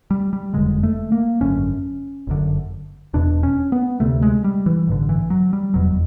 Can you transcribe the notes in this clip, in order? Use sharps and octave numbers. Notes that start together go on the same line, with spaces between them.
G3
G3
F#1 F2 D3 G#3
A3
A#3
G#1 F#2 D3 C#4
G1 F#2 D3
E1 E2 B2 D4
C#4
B3
D2 C3 A3
G#3
G3
E3
A1 G2 D3
E3
F#3
G3
F1 E2 B2 F#3